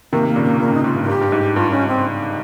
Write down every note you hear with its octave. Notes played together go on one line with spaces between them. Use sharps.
C3 D#3 A#3
A#3
A#2 C#3
A#3
A#2 C#3 A#3
A#2 C#3 D#4
G#2 F4
G2
F4
G2 G4
G2
G#2
G2 F4
G2 C#4
C4